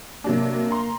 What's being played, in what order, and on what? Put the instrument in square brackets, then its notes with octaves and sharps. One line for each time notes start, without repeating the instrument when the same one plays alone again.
[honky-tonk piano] C3 F#3 D4 [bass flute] A#3
[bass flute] A#3
[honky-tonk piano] A#5 C6